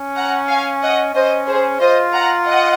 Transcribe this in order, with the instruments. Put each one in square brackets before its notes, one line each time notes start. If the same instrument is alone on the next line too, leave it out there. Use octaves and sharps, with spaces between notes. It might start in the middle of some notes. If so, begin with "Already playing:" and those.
Already playing: [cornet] C#4
[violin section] F#5 A#5
F5 G#5
D#5 F#5
[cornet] C#4 [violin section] C5 D#5
[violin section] G#4 C5
[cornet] F4 [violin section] C5 D#5
[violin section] F#5 A#5
D#5 F#5